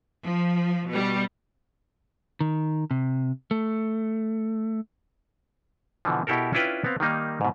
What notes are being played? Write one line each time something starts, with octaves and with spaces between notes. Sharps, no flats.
F3
B2 G3
D#3
C3
A3
B2 D3 E3 F3
B2 E4 G4 A4 A#4
C#4 D4 E4 F4 B4 G5
B3 C4 F5
D#3 G3 A#3 D#4
G#2 B2